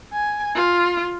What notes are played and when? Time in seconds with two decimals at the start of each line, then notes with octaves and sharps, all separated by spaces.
0.13 G#5
0.56 F4